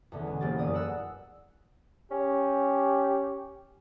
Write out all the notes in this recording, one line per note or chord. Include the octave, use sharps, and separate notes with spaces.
E2 D3 B3 C#4
B2 G#3
E1 A#3 G4 A6
G1 F#2 E4 D5 D#6
G#4 A#4 F#5 E6 F#6
C#4 G4